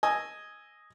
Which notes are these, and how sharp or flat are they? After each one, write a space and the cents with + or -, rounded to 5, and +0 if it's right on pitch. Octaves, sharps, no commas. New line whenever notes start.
D#5 +0 G#5 +0 E6 +0